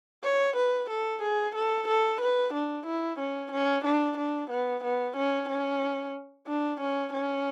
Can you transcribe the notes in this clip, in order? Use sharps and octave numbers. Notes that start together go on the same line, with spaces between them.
C#5
B4
A4
G#4
A4
A4
B4
D4
E4
C#4
C#4
D4
D4
B3
B3
C#4
C#4
D4
C#4
C#4